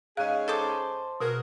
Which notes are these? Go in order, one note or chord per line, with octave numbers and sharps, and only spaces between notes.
G#2 C#4 G#4 D#5 F5 F#6
A4 C5 D6
B2 F#4 G#4 A#4